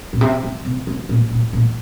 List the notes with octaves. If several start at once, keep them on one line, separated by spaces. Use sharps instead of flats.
A#2
C3
C3
C3
C3
A#2
A#2
A#2